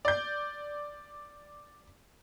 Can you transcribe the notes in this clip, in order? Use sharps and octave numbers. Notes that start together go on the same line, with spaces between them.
D5 G6